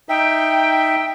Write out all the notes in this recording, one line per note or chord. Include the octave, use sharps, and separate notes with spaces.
D#4 E5 G5